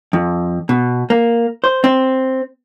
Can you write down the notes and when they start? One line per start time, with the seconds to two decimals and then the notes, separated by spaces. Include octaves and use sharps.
0.13 F2
0.69 B2
1.10 A#3
1.64 C5
1.84 C4